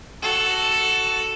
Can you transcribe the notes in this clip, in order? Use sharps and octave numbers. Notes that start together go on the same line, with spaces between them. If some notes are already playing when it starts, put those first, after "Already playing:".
F#4 A4